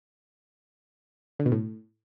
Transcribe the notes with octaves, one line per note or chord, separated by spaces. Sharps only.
D3
B2
A2